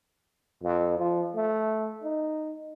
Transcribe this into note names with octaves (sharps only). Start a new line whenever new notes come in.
F2
F3
A3
D#4